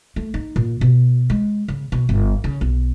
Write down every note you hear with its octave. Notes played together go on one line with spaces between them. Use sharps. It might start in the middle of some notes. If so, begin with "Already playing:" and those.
A3
D#4
A#2
B2
G#3
C#3
B2
G1
C#3
B1